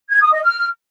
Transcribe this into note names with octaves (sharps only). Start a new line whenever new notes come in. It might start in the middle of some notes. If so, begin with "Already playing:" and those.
G#6
D#6
D#5
F6